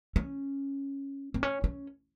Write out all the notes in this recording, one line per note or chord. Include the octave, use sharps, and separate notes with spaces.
C#4
C4
C#4
C#4